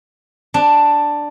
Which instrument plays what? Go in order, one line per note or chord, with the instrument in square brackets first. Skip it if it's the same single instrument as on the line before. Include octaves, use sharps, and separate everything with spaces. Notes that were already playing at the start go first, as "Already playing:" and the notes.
[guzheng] D4